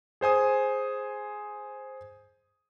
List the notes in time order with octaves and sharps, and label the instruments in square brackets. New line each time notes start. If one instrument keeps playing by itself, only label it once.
[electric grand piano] G#4 C5 G#5 D#6